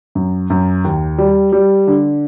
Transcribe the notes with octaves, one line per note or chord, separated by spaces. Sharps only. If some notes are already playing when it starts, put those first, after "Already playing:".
F#2
F#2
D#2
G3
G3
D3